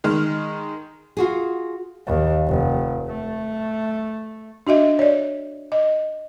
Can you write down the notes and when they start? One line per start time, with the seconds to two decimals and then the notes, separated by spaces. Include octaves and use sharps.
0.04 D#3 G#3 F6
1.17 F4 F#4 G#4
2.07 D#2
2.47 F1
3.07 A3
4.67 D4 F#4 D#5 E5
4.99 C#5 D5
5.72 D#5